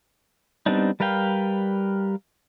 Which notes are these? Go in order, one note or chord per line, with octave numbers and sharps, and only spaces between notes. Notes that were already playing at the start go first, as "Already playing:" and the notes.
G3 B3 C4 D4 D#4
G3 A#4 B4 F5 G5